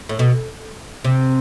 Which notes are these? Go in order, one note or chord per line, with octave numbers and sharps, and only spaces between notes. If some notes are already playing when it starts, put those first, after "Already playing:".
A2
B2
C3